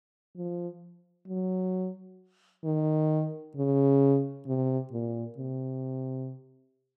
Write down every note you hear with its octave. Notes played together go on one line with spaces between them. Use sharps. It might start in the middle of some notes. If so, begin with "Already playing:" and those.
F3
F#3
D#3
C#3
C3
A#2
C3